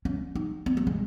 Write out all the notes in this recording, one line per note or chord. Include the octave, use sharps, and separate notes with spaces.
C#4
D#4
C4
A#3
G#3